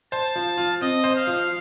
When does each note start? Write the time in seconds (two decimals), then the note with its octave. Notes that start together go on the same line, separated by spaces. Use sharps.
0.12 C5 A5
0.36 F3
0.57 F4
0.81 C4 D#5
1.04 C5
1.16 F5
1.27 F3